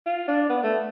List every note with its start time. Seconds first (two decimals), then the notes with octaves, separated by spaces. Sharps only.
0.06 F4
0.28 D4
0.49 B3
0.63 A3